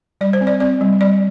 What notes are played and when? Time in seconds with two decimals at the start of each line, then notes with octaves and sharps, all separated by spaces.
0.21 G3 D5
0.33 C5
0.41 C4
0.47 D5
0.60 C4 D5
0.81 G3
1.01 G3 D5